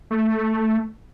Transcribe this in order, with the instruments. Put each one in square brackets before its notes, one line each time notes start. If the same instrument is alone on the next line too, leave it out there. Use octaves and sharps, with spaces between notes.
[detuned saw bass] A3